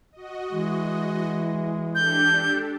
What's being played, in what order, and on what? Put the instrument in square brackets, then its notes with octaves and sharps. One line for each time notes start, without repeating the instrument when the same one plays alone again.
[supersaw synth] F#4 D#5
[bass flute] E3 [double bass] G#3
[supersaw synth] D4 G4 A4 [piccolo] G6